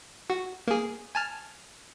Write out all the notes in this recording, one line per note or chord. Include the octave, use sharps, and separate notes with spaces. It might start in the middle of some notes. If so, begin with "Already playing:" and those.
F#4
A#3 G#4
G#5 A5 F6